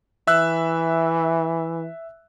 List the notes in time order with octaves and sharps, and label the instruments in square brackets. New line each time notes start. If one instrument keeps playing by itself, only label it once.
[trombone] E3 [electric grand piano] E5 E6 F#6